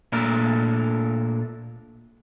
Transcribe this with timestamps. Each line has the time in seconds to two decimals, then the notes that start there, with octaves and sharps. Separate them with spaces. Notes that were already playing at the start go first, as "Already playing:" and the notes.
0.12 A#2 A3 D4 A#4